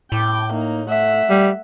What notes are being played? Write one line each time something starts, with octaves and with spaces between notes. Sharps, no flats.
A2 G5 D6
A#3 D#4
A3 E5 F#5
G3